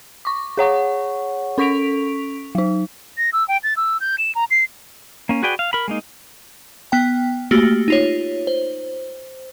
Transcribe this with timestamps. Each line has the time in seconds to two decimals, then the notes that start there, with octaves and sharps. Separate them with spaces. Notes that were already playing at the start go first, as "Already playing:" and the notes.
0.25 C#6 D6
0.57 G#4 C#5 F#5 C#6
1.58 C#4 A4 C#6 B6 D7 F7
2.55 F#3 D#4
3.18 A#6
3.33 E6
3.48 G5
3.63 A6
3.77 E6
4.01 G6
4.18 E7
4.35 A#5
4.51 C7
5.29 A#3 C#4
5.43 F#4 G#4 B4 D5 G5
5.59 F5
5.73 A#4 B5
5.88 G#3 A#3 D#4
6.92 B3 G5
7.51 A3 A#3 F#4 G4
7.88 D#4 F4 C#5
8.47 C5